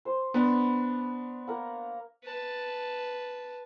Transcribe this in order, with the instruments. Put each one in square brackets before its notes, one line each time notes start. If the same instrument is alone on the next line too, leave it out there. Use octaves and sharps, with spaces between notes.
[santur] C5
[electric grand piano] B3 D4 [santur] B5 C6
[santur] A#3 A#4 F#5
[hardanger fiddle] B4 A5